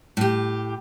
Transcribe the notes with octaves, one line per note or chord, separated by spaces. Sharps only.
A2 G4